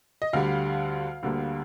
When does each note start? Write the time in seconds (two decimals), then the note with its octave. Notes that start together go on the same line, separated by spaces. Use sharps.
0.22 D#5
0.33 D2 D3 G3 F5
1.23 D2 D3 G3 A#3